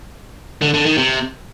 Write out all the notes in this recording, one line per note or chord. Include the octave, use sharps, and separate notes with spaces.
D3
D3
D#3
C3